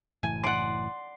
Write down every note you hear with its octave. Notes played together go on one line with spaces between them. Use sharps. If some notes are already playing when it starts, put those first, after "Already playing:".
F#1 A2 E3 G#5
D5 F#5 C6